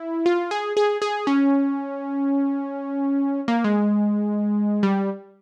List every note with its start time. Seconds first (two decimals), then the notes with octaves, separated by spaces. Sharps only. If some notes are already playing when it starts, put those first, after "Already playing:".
Already playing: E4
0.26 F4
0.51 G#4
0.77 G#4
1.02 G#4
1.27 C#4
3.48 A#3
3.64 G#3
4.83 G3